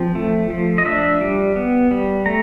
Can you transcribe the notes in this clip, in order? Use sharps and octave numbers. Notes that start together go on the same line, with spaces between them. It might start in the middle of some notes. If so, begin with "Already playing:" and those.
Already playing: F3 C4
A3
F3
D#5
D4 E5
G3
B3
G3
A3 A#5